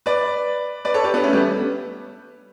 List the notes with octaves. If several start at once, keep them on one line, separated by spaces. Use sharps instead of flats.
B4 D5
B4 D5
A4 C#5
G4 B4
B3 D4
A3 C#4
G3 B3